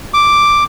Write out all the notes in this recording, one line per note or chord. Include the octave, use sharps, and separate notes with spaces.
D6